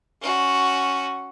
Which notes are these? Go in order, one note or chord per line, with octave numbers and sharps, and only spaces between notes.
C#4 F#4